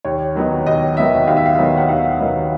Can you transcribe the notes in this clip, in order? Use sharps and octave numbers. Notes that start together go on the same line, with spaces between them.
D#2 C#5
D#3 F#3 B3 D#4
D#2 D#5
D#3 F#3 B3 D#4 E5
D#2 F5
E5
F5
D#3 F#3 B3 D#4
F#5
D#2 F5
D#3 F#3 B3 D#4